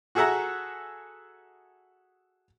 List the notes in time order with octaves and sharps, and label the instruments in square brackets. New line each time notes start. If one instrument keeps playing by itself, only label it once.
[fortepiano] F#4 G#4 A4 E5 F#5 A#5